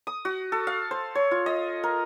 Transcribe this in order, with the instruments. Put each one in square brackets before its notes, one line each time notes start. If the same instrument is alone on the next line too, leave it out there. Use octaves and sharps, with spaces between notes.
[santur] D#6
F#4
A4
F5
C5
C#5
F4
D#5
A#4